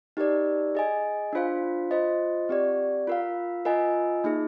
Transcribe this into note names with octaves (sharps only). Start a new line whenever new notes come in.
D#4 G4 A#4 D5
G#4 D#5 G#5
D4 F4 C5 F5
F4 C5 D#5
C4 G4 D5
F4 A#4 F5
F4 A#4 D#5 G#5
A#3 D#4 G#4